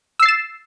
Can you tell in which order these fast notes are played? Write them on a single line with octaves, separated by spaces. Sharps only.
E6 C7 A6 E7